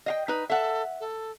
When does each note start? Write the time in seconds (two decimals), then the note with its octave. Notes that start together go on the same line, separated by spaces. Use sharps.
0.06 D#5 F5 G5
0.28 D#4 B4
0.50 A4 E5 F#5
1.00 A4